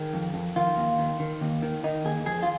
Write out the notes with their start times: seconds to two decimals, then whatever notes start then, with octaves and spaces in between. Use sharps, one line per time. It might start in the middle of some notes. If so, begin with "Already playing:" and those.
Already playing: D#3 G#4
0.14 F2
0.34 F2
0.56 D#3 F4
0.77 D#2
0.98 D#3
1.20 D#3
1.41 D#2
1.62 D#3
1.84 D#3 D#4
2.05 D#2 G#4
2.26 F2 G#4
2.43 F4